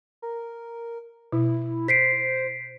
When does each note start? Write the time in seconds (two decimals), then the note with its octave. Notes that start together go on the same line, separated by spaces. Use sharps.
0.22 A#4
1.32 B2 E4
1.88 C5 B6 C7 D7